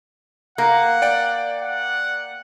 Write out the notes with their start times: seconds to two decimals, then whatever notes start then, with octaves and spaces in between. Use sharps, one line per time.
0.58 A#3 F#5
1.02 D5 G5 D7
1.62 F#5